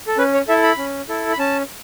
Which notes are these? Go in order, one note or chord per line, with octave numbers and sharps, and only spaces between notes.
A4
C#4 B4
C#5
E4 A4 E5
B5
C#4
E4 A4
B5
C#4 A5